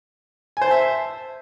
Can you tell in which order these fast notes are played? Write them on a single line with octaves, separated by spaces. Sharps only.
G#5 C5 A5 E5